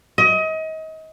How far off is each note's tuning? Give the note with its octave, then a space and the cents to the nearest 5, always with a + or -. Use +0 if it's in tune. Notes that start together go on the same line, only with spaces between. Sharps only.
D#5 +30